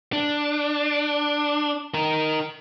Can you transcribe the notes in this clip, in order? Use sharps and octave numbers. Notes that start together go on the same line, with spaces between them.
D4
D#4 A#4